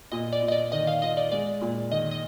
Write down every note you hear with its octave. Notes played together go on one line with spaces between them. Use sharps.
A#2 D#5
D5
A#2
D#5
D5
D#3 D#5
F5
F4 D#5
D5
G#3 D5
A#2
D#3 D#5
D#5